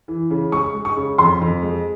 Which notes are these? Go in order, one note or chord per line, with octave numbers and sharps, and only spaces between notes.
E3
C#3
G#3 C#6
G#3
C#6
C#3
F2 C6
F2
G#3